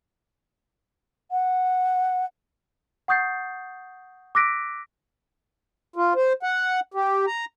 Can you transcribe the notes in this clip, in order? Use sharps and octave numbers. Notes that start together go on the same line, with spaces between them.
F#5
F#5 C#6 D#6 G6 A6 C7
D6 E6 F#6 A#6 B6 D7
F4
C5
F#5
G4
A#5